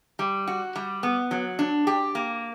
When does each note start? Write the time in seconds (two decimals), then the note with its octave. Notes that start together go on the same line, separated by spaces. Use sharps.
0.19 G3
0.47 F#4
0.76 G3
1.03 B3
1.31 F#3
1.59 D4
1.87 G4
2.15 A#3